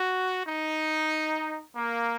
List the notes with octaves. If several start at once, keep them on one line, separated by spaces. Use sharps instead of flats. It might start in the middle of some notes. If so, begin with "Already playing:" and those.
Already playing: F#4
D#4
A#3